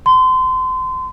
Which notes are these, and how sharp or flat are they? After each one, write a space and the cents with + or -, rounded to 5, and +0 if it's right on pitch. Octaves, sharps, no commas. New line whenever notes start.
C6 -30